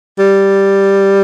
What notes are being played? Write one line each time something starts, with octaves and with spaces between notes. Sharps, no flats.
G3